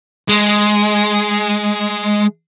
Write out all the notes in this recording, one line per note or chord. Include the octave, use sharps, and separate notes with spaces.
G#3